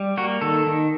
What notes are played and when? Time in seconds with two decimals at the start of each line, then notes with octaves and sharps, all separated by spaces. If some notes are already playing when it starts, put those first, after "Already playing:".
Already playing: G3
0.17 A#3 F#4
0.41 D#3 A4
0.67 D#3